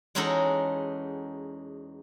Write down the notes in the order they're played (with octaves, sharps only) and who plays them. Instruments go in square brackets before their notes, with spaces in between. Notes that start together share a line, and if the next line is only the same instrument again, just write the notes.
[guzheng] E2 G#3 C#4 D#4 F#4 A4